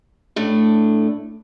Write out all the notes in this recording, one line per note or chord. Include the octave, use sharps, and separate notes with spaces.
A2 A3 D4